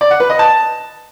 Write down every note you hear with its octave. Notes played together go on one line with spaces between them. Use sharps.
D5
F#5
B4
D#5
A5